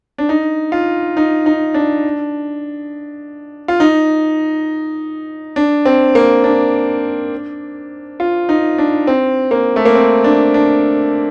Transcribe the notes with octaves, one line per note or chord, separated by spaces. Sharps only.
D4
D#4
F4
D#4
D#4
D4
F4
D#4
D4
C4
A#3
D4
F4
D#4
D4
C4
A#3
A3
A#3
C4
D4
D4